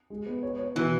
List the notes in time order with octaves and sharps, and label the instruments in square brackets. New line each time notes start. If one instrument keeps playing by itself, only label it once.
[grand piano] G#3
B3
C#5
C#5
[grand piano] B2 [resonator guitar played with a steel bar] E3